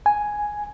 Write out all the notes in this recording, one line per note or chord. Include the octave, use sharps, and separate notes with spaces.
G#5